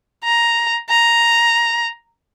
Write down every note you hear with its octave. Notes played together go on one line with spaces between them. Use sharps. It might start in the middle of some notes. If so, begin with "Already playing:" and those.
A#5
A#5